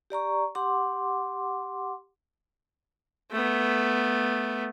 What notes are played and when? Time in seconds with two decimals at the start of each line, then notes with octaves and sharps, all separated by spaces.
0.10 G4 D5 A#5 C#6
0.55 G4 F#5 C6 D6
3.31 A3 B3